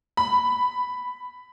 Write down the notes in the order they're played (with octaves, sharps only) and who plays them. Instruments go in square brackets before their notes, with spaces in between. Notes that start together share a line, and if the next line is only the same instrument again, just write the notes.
[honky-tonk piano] B5